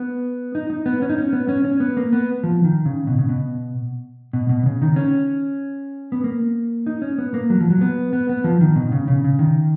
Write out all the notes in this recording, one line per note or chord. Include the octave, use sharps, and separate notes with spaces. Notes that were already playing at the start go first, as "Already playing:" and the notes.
Already playing: B3
D#4
D#4
B3
C#4
D#4
C#4
B3
C#4
C#4
B3
A#3
B3
F3
D#3
C#3
B2
C#3
B2
B2
B2
C#3
D#3
C#4
B3
A#3
D#4
C#4
B3
A#3
F#3
F3
F#3
B3
B3
B3
F3
D#3
B2
C#3
C#3
C#3
D#3